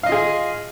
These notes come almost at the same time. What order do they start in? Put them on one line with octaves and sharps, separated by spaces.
F5 D#5 F4 G#4